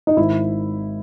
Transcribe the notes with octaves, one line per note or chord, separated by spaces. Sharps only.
D#4
G#1 E4